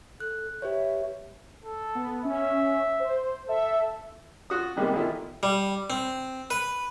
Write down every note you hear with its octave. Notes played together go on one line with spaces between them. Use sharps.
A4 F#6
G4 B4 C#5 E5
A4
B3
C#4 E5
C5
A4 E5
F4 F#4 D#6
C3 D#3 G3 G#3 A#3 B3
B2 D#3 E3 A3 E4 F4
G3
C4
B4